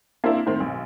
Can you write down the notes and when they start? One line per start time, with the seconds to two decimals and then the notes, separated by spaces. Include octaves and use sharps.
0.24 A#3 C4 D4 E4
0.46 A2 D#3 C4
0.60 B1